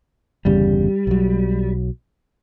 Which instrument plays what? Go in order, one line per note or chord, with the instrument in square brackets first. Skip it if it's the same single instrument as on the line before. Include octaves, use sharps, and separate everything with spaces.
[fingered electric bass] G1 E2 C#3 [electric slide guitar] G3
[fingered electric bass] B1 F#3